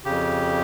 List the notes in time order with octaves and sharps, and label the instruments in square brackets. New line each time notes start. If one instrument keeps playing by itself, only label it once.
[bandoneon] F2 C#3 G4